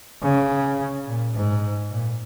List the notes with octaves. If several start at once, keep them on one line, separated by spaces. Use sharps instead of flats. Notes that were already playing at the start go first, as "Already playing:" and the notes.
C#3
A#2
G#2
A#2